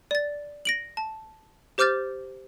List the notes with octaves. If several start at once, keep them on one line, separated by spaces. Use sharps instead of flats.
D5 A6
A#6 D7 F#7
A5
G4 C5 D6 F6 G6 A6